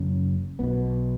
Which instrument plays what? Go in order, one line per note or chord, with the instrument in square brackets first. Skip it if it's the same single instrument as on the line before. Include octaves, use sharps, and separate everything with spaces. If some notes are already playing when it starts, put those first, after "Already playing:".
Already playing: [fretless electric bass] F#1 F#2 C#3
B1 B2 B3